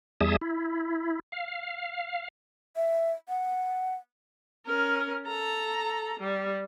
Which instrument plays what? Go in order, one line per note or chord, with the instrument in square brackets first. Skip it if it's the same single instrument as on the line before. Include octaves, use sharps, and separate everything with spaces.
[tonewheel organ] E2 G3 G#4 E5 A5 D#6
E4
F5
[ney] E5
F#5
[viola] C#4 A#4
A4 A#5
G3